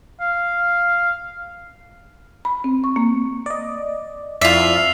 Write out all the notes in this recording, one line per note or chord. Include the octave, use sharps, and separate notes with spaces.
F5
B5
C4
C#6
A#3
D5 D#5
F2 E4 F4 D5 E5 E6 C7 F7